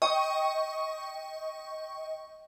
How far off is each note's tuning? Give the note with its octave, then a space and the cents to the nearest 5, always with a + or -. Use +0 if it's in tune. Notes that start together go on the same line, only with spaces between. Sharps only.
D#5 +15 G5 +0 C#6 +0